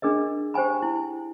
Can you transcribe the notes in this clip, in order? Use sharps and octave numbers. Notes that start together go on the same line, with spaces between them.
D4 G#4 A#4 D#5
G4 C5 G5 G#5 B5
E4